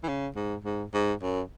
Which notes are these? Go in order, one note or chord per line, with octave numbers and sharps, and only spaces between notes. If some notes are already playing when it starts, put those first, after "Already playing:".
E3
C#3
G#2
G#2
G#2
F#2